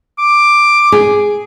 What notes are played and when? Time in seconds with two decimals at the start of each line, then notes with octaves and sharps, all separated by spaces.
0.19 D6
0.92 G#4